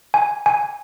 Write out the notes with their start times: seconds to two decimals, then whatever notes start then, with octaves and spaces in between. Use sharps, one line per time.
0.14 G#5
0.46 G#5